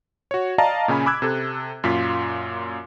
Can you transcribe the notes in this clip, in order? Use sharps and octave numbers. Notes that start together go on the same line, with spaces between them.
F#4 C#5
D5 D#5 F5 A5 A#5
A#2 C#3 C#4 G#5 B5
B5 D6 E6 F#6 G#6
C3 A4
F#2 A#2 F4 B6